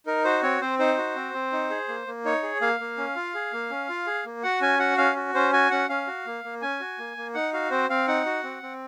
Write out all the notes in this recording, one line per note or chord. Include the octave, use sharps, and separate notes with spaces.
D#4 A#4
F#4 C5
C4 C#5
C4 C5
D#4 C5
F#4
C4
C4
D#4
G#4
A#3
A#3
D#4 C#5
G#4
A#3 F5
A#3
C#4
F4
G#4
A#3
C#4
F4
G#4
A#3
F#4 F#5
C#4 G#5
F#4 F#5
C#4 F5
F#4
C#4 C5
F#4 G#5
C#4 F#5
C#4 F5
F#4
A#3
A#3
C#4 G#5
F#4
A#3
A#3
D#4 F#5
F#4 F5
C4 C5
C4 F5
D#4 F#5
F#4
C4
C4